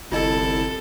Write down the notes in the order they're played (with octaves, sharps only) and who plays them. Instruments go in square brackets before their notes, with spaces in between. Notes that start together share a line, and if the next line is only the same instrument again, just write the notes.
[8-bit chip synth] G1 E4 A5 [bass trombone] C2 [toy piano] F4 D#5 [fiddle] A4